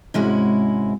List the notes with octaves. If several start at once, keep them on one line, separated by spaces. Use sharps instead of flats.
G#2 C3 G#3 C#4 E4 F#4